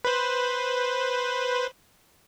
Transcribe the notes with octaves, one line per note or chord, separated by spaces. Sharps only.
B4 C5